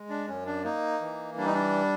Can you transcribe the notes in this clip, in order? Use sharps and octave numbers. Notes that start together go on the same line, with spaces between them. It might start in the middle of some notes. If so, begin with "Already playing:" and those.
Already playing: G#3
D4
F#2 C#4
D4
A#3 D#4
E3
G3 D4
D#4
D4